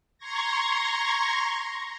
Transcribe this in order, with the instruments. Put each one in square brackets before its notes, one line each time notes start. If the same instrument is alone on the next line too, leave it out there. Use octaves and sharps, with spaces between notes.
[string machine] A#5 C6 C#6 G#6 A#6